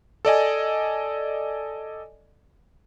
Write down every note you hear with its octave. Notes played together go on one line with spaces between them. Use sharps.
A4 D5 D#5 G#5